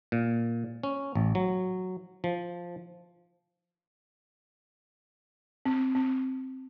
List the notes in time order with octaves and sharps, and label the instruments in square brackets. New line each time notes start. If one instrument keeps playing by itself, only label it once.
[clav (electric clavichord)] A#2
C#4
A1
F#3
F3
[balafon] C4
C4